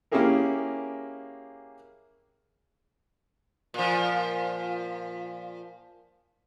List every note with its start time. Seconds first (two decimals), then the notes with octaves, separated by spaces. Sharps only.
0.12 A#3 C#4 E4 G4 G#4 A#4
3.74 A#2 F3